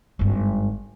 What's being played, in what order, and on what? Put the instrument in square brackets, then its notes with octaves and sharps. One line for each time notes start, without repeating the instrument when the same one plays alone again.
[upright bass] G#1 G2